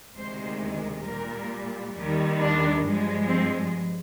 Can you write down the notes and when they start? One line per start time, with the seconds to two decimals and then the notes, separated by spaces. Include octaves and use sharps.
0.16 D2 C3 D#3 G#3 C5
1.05 A#2 G3 A#4
1.95 D#2 D#3 G3
2.40 D4
2.85 G2 F3 G#3
3.28 C4